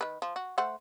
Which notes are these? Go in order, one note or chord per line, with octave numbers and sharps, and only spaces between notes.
D#3 B4
F3
F#4
A3 C5 F#5